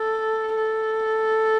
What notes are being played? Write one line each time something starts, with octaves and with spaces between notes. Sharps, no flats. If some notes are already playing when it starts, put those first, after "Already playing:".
Already playing: A4
A4